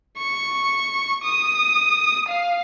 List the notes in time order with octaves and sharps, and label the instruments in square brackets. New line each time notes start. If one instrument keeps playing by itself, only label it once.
[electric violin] C#6
D#6
F5